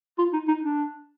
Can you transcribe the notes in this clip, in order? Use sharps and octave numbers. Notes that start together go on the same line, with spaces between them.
F4
D#4
D#4
D4